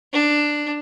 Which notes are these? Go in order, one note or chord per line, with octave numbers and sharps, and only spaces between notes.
D4